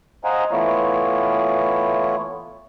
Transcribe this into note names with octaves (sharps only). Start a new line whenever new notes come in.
C5 D#5 F5 F#5 G#5 A#5
E3 A3 B3 E4 F4 C#5